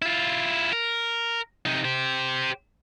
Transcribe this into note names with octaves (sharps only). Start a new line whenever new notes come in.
E4 F4
A#4
C3 D#4
G4 C5